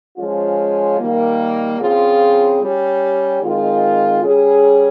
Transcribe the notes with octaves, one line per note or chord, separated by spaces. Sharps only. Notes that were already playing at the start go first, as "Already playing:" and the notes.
F3 G#3 C#4 F4
D#3 G3 A#3
C#3 F3 C4 F4 G#4
G3 C#4 G4
D#3 G#3 C4 F4
C#3 G3 C#4 G#4